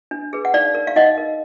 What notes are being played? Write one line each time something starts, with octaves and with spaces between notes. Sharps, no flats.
D4
G#4 B4
F#5
D#4 D5 F5
A#4
F5
D#4 D#5 F#5
A#4